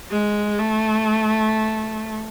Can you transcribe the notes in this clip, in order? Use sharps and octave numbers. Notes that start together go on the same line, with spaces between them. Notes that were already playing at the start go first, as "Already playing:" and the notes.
G#3
A3